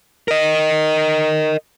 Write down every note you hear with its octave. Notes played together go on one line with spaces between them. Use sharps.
A#4 D#5